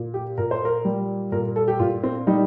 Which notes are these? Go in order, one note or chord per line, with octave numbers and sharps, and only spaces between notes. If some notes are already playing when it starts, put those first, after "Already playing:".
Already playing: A#2
G4
A#2 A#4
C5
A#4
G3
A#2 A#4
A4
G4
A#2 F4
C4
G3 D#4